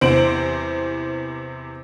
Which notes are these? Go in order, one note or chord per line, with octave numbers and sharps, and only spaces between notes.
E2 C3 C5 D7 F#7